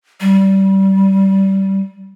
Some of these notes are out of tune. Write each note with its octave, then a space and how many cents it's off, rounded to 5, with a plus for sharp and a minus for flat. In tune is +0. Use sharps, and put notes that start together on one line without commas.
G3 -20